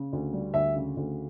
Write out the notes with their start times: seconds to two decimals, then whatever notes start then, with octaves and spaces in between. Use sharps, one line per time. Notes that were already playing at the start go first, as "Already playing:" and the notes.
Already playing: C#3
0.13 D2
0.33 G3
0.54 D2 E5
0.76 C#3
0.97 D2